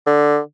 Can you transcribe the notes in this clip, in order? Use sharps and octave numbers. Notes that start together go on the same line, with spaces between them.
D3